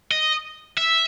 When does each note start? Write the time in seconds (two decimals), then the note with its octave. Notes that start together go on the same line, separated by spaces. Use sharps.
0.11 D#5
0.78 E5